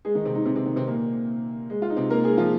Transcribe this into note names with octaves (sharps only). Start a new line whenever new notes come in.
G#3 G#4
D#3 D#4
C3 C4
D#3 D#4
C3 C4
C3 C4
D#3 D#4
C3 C4
A#2 A#3
G#3
F4
D#4
C3 C4
A#3 A#4
G#3 G#4
F3 F4